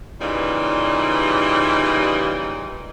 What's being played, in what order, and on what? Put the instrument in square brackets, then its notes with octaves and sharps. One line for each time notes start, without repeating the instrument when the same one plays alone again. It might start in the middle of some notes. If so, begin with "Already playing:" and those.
[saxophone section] A#2 C#3 E3 G3 D#4